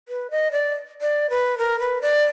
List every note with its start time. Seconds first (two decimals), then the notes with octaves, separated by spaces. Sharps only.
0.09 B4
0.31 D#5
0.52 D5
1.02 D5
1.30 B4
1.58 A#4
1.80 B4
2.02 D5